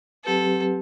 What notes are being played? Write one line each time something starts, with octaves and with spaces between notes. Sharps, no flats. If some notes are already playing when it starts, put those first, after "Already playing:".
F#3 C4 G4 A4 B4